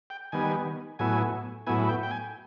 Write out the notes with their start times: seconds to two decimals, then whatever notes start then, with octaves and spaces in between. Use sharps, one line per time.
0.10 G5
0.32 D#3 G3 B3 G#5
0.99 A2 F#3 B3 E4 G#5
1.67 A2 F#3 B3 E4 G#5
1.89 G5
2.03 G5
2.11 G#5